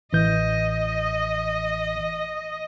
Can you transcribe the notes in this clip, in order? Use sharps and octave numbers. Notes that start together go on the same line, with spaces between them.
A1 E3 D#5 G6